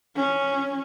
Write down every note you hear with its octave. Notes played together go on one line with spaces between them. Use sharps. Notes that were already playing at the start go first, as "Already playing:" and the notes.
C#4